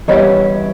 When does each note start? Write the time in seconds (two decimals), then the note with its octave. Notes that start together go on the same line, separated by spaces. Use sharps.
0.08 E3 G3 B3 E4 G4 C#5 D#5